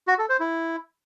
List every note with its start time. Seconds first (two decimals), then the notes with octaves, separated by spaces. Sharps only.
0.08 F#4
0.18 A4
0.29 C5
0.40 E4